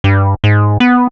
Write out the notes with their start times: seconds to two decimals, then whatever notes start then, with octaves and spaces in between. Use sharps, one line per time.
0.04 G2
0.44 G#2
0.80 B3